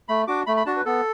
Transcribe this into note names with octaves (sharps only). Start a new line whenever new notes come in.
A3 B5
D4 F#4 D6
A3 B5
B5
D4 F#4 A5
B4
B3 A4